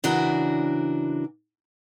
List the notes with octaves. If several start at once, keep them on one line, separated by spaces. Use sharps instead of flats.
C#3 E3 D4 F#4 A#4